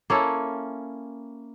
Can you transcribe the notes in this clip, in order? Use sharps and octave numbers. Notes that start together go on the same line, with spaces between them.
A#3 C#4 E4 A4